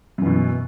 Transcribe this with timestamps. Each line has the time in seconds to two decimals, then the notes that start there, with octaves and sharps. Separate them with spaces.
0.18 F#2
0.22 E3
0.26 B2